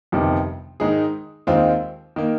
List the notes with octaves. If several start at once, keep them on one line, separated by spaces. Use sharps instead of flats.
G1 F2 C3 D#3 G3
G#2 D#3 G#3 D#4 G#4
D#2 D#3 G#3 C4 F4
D#3 A#3